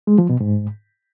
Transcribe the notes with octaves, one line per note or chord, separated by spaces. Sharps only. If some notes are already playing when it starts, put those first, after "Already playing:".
G#3
F3
B2
G#2